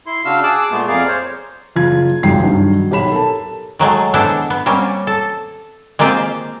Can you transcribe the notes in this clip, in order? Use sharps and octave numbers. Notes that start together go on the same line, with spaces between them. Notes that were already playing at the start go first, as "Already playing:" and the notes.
E4 C6
C#3 D4 F#4 F5 E6
G#4 A5 D6 E6 F#6
A#2 G#3 A3 B3
F2 G#4 A#4 D5 F5
C5 C#5
F#1 F4 G#6
G#1 C#2 F#2 G5 C7
G2 D#3 F#3
B1 G4 C#5 B5 E7
A4 A#4 A5
D#3 F#3 G#3 A3
G#3 B3 D4 E4 A4 C5
B3
G3 A#3 C4 C#4
A4
G#3 A#3 C4 F4 G4 C5